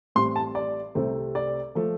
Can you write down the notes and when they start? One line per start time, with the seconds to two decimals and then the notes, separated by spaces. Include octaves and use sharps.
0.15 A1 A2 G3 C4 C6
0.36 A5
0.55 D5
0.95 C2 C3 A3 C4
1.35 D5
1.75 F3 A3